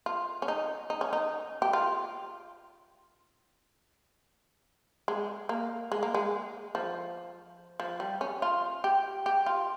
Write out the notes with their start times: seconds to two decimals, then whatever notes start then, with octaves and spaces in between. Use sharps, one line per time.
0.06 F4
0.42 C#4
0.48 D#4
0.90 D#4
1.01 C#4
1.13 D#4
1.62 G4
1.73 F4
5.08 G#3
5.49 A#3
5.92 G#3
6.03 A#3
6.14 G#3
6.75 F3
7.80 F3
8.00 G3
8.21 C#4
8.42 F4
8.84 G4
9.26 G4
9.46 F4